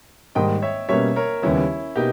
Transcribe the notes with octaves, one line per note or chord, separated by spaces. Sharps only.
G#2 D#3 G3 A#3 D#5 G5
C#5 E5
B2 G3 A#3 C#4 C#5 E5
A#4 C#5
D#2 C#3 G3 B3 C#4 E4
B2 A#3 D#4 G4